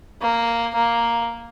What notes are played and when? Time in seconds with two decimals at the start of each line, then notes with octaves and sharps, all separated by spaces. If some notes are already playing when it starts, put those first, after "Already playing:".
0.21 A#3
0.75 A#3